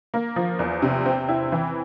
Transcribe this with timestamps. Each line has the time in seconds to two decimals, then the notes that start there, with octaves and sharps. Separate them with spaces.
0.14 A#3
0.36 F3
0.59 E2
0.82 C3
1.06 C4
1.29 E4
1.52 E3